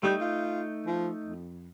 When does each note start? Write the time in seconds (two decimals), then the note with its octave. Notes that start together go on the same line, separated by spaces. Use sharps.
0.03 G3 A3 D#4 G6
0.21 F4
0.86 F3
1.24 F2